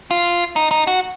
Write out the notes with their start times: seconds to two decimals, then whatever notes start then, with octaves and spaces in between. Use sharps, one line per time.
0.11 F4
0.56 D#4
0.71 D#4
0.87 F#4